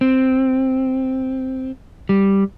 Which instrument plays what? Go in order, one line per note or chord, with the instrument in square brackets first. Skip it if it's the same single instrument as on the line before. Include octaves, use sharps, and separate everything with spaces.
[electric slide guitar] C4
G3